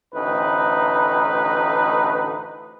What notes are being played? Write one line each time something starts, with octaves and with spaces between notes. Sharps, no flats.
A1 D2 D#4 B4